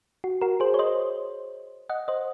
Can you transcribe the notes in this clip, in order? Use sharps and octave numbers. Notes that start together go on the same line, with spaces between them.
F#4
F#4 A#4
G#4 C5
C#5
C5 D#5
D#5 F#5
C5 D#5